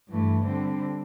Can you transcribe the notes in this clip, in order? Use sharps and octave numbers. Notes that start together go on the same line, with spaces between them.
G2 E3 A3
D3 G3 C4